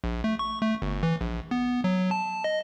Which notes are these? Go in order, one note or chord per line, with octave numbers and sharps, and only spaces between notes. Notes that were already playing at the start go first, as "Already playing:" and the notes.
A#1
A3
C#6
A3
G1
E3
A#1
B3
F#3
A5
D#5